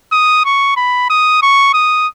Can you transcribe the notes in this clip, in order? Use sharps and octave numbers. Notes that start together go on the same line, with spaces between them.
D#6
C#6
B5
D#6
C#6
D#6